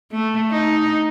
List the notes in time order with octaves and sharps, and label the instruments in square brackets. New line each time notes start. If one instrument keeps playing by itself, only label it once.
[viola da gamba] A3
D#4